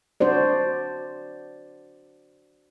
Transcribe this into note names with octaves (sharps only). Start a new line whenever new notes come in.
D4 F#4 C5 D5